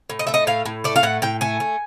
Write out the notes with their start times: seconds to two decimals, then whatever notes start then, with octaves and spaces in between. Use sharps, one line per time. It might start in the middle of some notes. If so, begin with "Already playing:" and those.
0.10 A2
0.19 D#5
0.27 A3 E5
0.34 D#5
0.47 A2 F5
0.65 A2
0.84 A3 D5
0.96 F5
1.03 A2 F#5
1.22 A2 G5
1.41 A3 G#5
1.60 A3